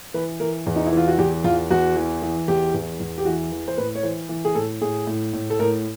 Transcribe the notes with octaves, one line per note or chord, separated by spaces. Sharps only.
E3 B4
E3 A#4
E2
D#4
E4
E3 F4
F#4
E2 G4
E2 F4
E2 F#4
E3
E3
E2 G4
E2
E2
G4
E3 F#4
E3
C5
A2 B4
C#5
E3 C5
E3
G#4
A2 A4
A2 G#4
A2
A2
A4
A2 A#4